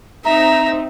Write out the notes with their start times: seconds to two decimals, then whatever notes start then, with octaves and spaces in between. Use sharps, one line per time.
0.25 C4 D#4 E5 A#5